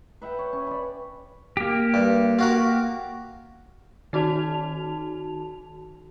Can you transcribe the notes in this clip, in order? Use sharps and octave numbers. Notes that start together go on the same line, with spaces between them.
B4 E5 F#5 G5
C#5
C#4
D5 B5
A#3 G4
G2
F4 F#4 A#4
D#3 D#4 F#4 A5 F7